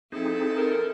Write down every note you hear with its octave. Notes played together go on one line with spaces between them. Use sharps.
F3 C4 D#4 E4 G#4 A4
A#4